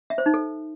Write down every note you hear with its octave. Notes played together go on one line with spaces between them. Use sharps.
E5
C5
D#4
A4